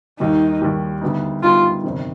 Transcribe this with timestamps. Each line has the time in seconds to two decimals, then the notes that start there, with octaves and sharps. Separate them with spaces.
0.20 D#2 D#3 G3 D#4
0.62 D#2 D#3 G3
1.02 D2 D3 G3 B3 D#4
1.43 D2 D3 G3 B3 D#4 F4
1.84 G1 F2 C3 D#3